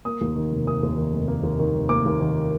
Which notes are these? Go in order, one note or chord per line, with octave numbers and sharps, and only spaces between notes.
A#3 D#6
D#2
D#3
F1
A#3 D#6
D#2
D#3
F1
A#3
D#2
D#3
F1
A#3 D6
D#2
D#3